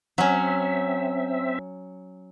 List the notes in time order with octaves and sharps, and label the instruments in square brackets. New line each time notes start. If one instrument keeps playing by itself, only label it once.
[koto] F#3 C#4 [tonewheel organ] C4 E5